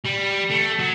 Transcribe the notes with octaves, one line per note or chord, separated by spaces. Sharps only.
G3
A3
F#3